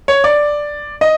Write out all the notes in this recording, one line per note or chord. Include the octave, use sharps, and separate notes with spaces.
C#5
D5
D#5